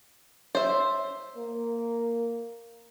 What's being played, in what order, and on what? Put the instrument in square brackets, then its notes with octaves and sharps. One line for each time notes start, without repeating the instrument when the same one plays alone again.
[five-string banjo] C5 E5 [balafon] C#5
[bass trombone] A#3